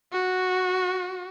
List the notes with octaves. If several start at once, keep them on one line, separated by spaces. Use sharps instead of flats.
F#4